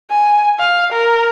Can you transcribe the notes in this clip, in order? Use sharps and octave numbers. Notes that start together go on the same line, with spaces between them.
G#5
F5
A#4